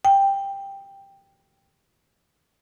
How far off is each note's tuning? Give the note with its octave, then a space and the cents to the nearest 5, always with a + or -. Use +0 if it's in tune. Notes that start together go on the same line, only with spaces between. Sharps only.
G5 +10